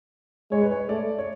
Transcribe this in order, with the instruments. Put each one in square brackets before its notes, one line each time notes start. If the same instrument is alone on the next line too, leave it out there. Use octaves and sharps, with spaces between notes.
[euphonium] G#3 [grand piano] C#5
[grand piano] B4
C#5
[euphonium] A3 [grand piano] D5
[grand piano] C#5